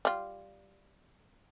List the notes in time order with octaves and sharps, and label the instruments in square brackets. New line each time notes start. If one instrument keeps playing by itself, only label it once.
[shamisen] G3 F4